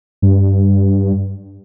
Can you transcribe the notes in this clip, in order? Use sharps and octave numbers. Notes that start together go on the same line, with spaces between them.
G2